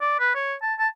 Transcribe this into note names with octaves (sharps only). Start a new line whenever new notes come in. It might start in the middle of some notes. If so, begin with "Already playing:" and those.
D5
B4
C#5
A5
A5